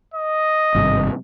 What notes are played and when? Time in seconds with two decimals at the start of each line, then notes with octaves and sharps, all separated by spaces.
0.14 D#5
0.75 G#1 G2 C3